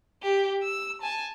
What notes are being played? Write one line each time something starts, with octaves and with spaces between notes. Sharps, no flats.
G4
E6
G#5 A5